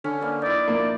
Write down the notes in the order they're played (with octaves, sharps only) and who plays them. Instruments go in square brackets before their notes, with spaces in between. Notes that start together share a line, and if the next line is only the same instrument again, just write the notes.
[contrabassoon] D3 [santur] C#4
[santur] A#3 B4 D5
[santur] D#4 E4 [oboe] D5
[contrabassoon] A#1 [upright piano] A#3